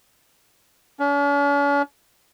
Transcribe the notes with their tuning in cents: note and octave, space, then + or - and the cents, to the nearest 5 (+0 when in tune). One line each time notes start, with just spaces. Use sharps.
C#4 +45